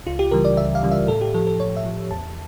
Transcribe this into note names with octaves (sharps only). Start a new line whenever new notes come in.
C#2 F4
G4
C#3 E3 G3 A#4
D5
C#2 E5
F5
C#3 E3 G3
E5
A2 A4
G4
F3 A4
A4
A2 C#5
E5
F3
E2 A5